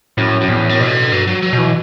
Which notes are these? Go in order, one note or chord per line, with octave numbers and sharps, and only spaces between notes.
F#2 A2
F#2
E2 A2
F#2
B2
D3
G2 F#3
F#3
F#3
B2
E3